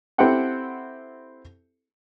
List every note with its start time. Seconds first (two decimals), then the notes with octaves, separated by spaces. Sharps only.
0.18 C4 E4 G4 A4 F#5 G5